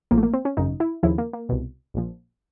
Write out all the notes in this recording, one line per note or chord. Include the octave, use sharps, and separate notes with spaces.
A1 A2 F3 A#3
A3
A#3
C4
C#4
G#1 F#2 C#3 D#4
E4
D#2 C#3 F3 E4
A#3
A#3
C2 B2
A#1 A#2 F3